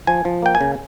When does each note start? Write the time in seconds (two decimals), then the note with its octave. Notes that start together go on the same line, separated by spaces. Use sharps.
0.07 F3 G#5
0.25 F3
0.42 A#3 G5
0.55 G#5
0.61 C#3